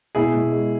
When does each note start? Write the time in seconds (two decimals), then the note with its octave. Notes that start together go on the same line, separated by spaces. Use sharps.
0.15 B2 E4 G#4
0.34 B2
0.52 G#3